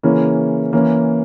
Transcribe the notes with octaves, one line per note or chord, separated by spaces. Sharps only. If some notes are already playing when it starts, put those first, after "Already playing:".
C#3 E3 A#3 C#4 E4
E3 A#3 C#4